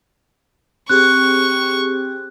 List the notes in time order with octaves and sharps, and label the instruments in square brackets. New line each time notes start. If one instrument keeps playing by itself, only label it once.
[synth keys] C4 G4 G#4 [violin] C#6 [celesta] F#6